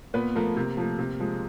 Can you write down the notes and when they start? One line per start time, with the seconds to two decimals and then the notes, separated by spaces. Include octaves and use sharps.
0.14 A#2 B3 B4
0.35 F3 A3 A#3 A#4
0.57 C3
0.77 F3 A3
0.99 C3
1.20 F3 G#3